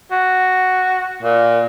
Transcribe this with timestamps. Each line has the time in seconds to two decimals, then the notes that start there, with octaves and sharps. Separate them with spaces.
0.11 F#4
1.22 A#2